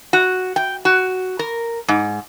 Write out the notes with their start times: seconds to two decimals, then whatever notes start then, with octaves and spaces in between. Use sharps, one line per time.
0.13 F#4
0.56 G5
0.85 F#4
1.39 A#4
1.88 G#2